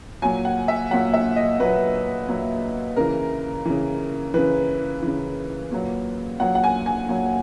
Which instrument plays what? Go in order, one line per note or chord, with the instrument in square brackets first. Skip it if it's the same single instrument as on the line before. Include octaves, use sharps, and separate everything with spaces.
[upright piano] A#2 F#3 G#5
F#5
E5
A#2 F#3 F#5
E5
D#5
A#2 F#3 B4
A#2 F#3
C#3 E3 A#4
C#3 E3
C#3 E3 B4
C#3 E3
A#2 F#3
A#2 F#3 F#5
F#5
G#5
G#5
A#2 F#3